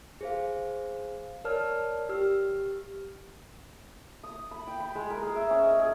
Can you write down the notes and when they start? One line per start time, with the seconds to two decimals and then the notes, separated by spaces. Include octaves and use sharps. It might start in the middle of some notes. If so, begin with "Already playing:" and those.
0.21 G#4 C5 F5
1.45 A#4 C#5 D5 A5 F6
2.09 G4 E6 F6
4.24 D#6
4.51 B5
4.67 G5
4.80 B5
4.95 G#3
5.10 A#4
5.23 G#4
5.36 E5
5.50 C#4
5.64 D#5
5.79 G#4